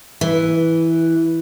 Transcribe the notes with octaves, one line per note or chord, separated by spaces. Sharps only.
E3